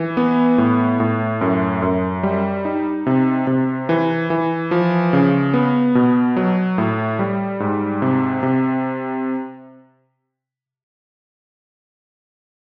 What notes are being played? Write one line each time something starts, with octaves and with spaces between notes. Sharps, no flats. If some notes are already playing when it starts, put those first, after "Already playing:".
Already playing: E3
B3
A2
A2
F#2
F#2
G3
D#4
C3
C3
E3
E3
F3
C#3
B3
B2
F#3
A2
G3
G#2
C3
C3